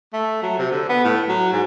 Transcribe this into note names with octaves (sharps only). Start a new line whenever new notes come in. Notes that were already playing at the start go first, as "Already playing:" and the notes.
A3
F#3
C3
D3
B3
A2
F#3
G#2